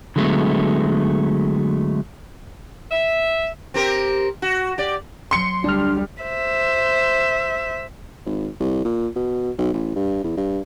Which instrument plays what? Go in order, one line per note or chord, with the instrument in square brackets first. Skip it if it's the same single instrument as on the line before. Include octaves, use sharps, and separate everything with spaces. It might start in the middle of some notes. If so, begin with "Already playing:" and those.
[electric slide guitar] D3 F#3 G#3 A3 B3
[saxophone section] E5
[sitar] C4 G4 A#4
F#4
G4 D5
[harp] F#3 D7 [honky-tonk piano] C6 C#7
[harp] D2 A5 C7 [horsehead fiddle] G3 [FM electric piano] D4 F6
[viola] C5 E5
[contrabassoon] G#1
C2
A#2
B2
B1
A1
G2
E2
G2